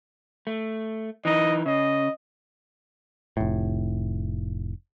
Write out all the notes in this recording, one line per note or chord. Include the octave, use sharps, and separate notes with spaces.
A3
E3 D#4 D#5
C#3 D#5
F1 A2